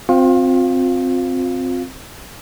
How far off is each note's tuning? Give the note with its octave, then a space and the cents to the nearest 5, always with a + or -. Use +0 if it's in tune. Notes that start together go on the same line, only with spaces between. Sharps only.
C4 +0 F4 +35 F5 +0